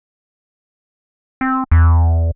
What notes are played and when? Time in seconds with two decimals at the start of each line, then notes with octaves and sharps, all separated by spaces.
1.41 C4
1.71 E2